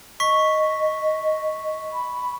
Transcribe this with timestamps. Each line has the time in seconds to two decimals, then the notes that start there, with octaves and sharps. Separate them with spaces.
0.20 D#5 C#6 B6
1.92 B5